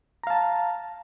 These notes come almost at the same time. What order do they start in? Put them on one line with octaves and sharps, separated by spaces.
A#5 F5 A5